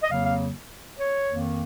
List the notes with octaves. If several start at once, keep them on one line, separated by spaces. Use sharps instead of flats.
D#5
F2 C#3 F#3 A#3 F5
F5
C#5
F2 D#3 A#3